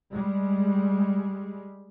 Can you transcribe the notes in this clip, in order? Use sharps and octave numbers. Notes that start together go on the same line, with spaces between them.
G3 G#3